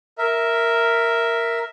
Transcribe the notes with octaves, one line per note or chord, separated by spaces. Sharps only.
A#4 E5